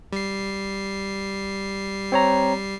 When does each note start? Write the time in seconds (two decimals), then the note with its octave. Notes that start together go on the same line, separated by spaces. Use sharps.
0.13 G3 C7
2.12 C4 C#5 A#5